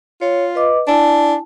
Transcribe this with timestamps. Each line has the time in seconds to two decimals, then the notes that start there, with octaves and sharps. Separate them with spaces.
0.21 F4 C#5
0.55 B4 D#5 D6
0.87 D4 E4 G#5 A5